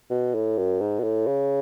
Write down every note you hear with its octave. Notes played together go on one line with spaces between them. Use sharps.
B2
A2
F#2
G#2
B2
A2
C#3